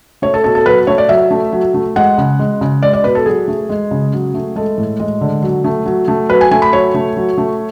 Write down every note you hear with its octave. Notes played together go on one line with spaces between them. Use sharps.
A3 C#5
A4
B2 A4
A4
F#3 B4
A3 C#5
D5
F#3 E5
A3
F#3
A3
G#3 F#5
C#3
G#3
C#3
G#3 D5
D5
B2 B4
A4
F#3 G#4
A3
G#3
C#3
F#3
A3
G#3 A4
A2
G#3
D3
F#3
A3
F#3
A3
F#3 B4
G#5
A3 G#5
B5
F#3 C#5
A3
F#3
A3